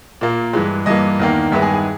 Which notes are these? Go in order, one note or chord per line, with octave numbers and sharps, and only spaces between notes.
A#2 A#3
G2 E3 G#3
G2 E3 A#3 D#5
E2 D#3 A#3
G2 D#3 G#3 B3 E5
G#4
G#4